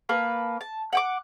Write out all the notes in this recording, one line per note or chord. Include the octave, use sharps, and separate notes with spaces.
A#3 B4 A5
A5
F#5 G5 D6